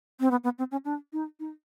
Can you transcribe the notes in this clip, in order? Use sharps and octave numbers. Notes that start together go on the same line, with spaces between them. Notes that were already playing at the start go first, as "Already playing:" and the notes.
C4
B3
B3
C4
C#4
D4
D#4
D#4